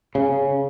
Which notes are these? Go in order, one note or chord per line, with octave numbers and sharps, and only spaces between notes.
C#3